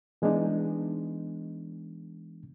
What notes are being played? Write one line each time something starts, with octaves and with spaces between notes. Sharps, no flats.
E3 G#3 B3 D4 D#4